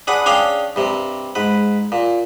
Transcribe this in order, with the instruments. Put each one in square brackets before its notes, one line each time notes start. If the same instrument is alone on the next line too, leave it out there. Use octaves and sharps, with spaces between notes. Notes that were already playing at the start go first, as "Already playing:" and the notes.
[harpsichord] D4 G#4 B4 F#5
C#4 D4 G#4 D5 F5 G5
G2 C3
G#2 B4
A#2